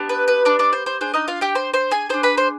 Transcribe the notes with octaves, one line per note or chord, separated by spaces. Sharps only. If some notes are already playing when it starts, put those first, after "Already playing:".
Already playing: B3 D4 G4
B4
B4
D4 D5
D4 D5
C5
C5
D4 G#4 C5
D#4 D#5
F4 F5
G4 G5
C5 C6
C5 C6
G#4 G#5
D4 G#4 C5 C6
B4 B5
C5 C6